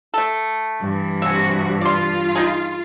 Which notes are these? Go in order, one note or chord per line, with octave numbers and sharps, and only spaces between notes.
A3 A4
G2 E3
C3 F#4 E5 G#5
F4 D5 C6
D#4 G#4